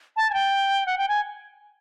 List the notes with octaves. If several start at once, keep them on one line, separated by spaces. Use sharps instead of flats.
A5
G#5
G5
F#5
G5
G#5